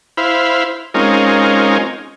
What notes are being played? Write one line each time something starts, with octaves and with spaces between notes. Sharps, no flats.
E4 C5 F5 B5
G#3 C4 C#4 D#4 F4 A#4